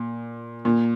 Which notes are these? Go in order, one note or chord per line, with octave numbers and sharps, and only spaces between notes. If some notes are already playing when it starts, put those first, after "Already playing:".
Already playing: A#2
A#2